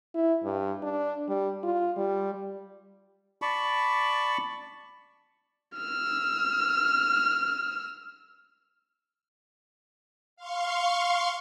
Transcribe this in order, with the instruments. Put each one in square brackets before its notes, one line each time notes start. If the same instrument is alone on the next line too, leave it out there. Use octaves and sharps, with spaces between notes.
[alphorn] E4
G2
D4
G3
F4
G3
[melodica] D5 A5 B5 C#6
[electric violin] E6 F6
[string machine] F5 C6 C#6